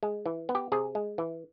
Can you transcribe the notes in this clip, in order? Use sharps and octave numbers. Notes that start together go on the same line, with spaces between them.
G#3
E3
B3
G4
C3 G#4
G#3
E3